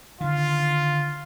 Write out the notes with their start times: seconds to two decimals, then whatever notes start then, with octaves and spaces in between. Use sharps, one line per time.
0.21 D3 D#3 F4